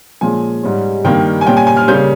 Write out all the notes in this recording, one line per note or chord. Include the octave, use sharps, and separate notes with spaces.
A#2 F3 G#3 C#4 G#5
G#2 G3 C#4
G2 D#3 G3 A#3 G5
G#5
A#2 G3 C#4 G5
G#5
G#5
F6
C#3 G3 A#3 C#4 G6